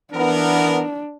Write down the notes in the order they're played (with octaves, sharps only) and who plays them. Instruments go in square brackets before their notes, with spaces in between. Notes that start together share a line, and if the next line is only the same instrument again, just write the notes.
[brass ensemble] E3 B3 A#4 [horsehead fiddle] D4